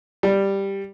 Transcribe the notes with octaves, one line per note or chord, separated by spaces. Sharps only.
G3